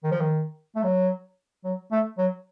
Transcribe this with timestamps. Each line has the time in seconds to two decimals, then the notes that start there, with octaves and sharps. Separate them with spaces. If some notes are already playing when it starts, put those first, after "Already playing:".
0.04 D#3
0.12 F3
0.21 D#3
0.76 A3
0.84 F#3
1.65 F#3
1.92 A3
2.18 F#3